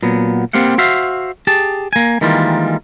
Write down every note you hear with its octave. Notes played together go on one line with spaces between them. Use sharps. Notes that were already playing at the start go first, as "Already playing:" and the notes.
A#2 F#3 B3
G3 A#3 C4 G4 F5 F#5
F#4 C5 E5 F5
G4 G#4 A5
A#3 G#5
D#3 E3 G3 G#3 A#3 F4